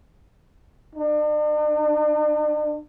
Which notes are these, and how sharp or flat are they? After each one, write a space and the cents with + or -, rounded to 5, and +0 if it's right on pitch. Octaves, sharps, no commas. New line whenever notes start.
D4 +45